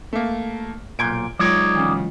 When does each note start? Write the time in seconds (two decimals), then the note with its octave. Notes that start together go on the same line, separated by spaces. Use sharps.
0.13 A3 A#3
0.99 B1 A#2 G6 G#6 D7
1.39 F#3 G#3 D#4 F4 C#5 D5
1.75 D2 C#3 E3